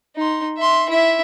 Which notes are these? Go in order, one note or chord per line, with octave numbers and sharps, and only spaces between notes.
D#4 C6
E5 C6
E4 E5